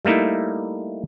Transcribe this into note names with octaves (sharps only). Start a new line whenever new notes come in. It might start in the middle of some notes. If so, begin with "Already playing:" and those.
G3 A3 A#3 D#4 E4